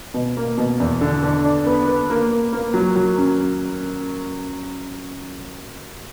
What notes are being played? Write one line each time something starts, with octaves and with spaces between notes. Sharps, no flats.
B2
A#3
B2
E2
D3
D3
D4
B3
B3
A#3
A#3
A#3
F#3
F#3
C#4